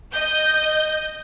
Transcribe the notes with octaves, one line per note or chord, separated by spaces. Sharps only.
D#5 G6